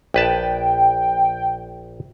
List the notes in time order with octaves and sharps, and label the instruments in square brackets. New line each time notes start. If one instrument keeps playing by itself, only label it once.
[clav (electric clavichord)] A#1 B4 A5 [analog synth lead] G5